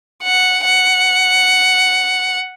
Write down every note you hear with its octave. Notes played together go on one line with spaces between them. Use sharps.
F#5
F#5